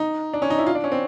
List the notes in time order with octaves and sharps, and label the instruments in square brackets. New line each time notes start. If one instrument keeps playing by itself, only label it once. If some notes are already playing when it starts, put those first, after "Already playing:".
Already playing: [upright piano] D#4
D4
C#4
D#4
E4
F4
D4
C#4
C4